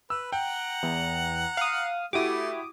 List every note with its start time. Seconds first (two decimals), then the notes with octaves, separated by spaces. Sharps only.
0.10 B4 E6
0.32 F#5 G5 A#5
0.83 E2
1.57 F5 D#6
2.13 A3 E4 F#4 G4 D6 D#6